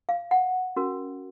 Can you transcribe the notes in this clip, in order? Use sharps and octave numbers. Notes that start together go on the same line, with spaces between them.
F5
F#5
C#4 F#4 A#4